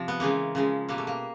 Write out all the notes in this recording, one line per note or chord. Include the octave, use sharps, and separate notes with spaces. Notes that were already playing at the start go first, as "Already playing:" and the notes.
Already playing: C3 F3
B3
C#3 E3 G#3 A#3
C#3 F3 G#3
B2 G3 A#3
A3
A#3